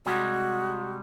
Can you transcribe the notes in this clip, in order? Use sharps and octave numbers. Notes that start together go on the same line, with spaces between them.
C3 G3 G#3 F#4